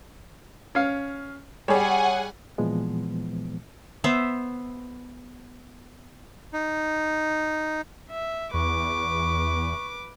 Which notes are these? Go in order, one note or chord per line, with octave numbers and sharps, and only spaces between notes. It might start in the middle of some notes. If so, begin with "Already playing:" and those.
C#4 F5
G3 G#4 C#5 F#5 G#5
A#2 E3 F3 G#3 B3
B3 C5 E5
D#4
E5
E2 B4 C#6 D6